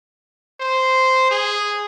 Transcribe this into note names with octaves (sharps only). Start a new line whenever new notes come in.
C5
G#4